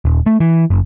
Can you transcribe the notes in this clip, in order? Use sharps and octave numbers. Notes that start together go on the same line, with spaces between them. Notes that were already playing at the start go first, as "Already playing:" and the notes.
D#1
A3
E3
F#1